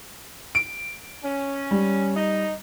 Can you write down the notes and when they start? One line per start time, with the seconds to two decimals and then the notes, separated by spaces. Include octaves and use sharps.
0.55 D7
1.24 C#4
1.71 G3
2.16 D#4